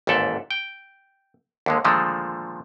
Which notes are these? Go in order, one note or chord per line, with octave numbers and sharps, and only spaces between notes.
A1 D#2 G#2 A4 D5 E5
G5
D#2 D3 G#3
A#2 D3 D#3 F3 G#3 A3